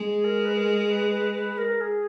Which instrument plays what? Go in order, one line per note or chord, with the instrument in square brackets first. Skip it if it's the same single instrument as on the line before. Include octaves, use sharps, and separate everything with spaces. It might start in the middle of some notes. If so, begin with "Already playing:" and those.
Already playing: [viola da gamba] G#3
[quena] G#4
A#4
B4
A#4
B4
B4
B4
A#4
G#4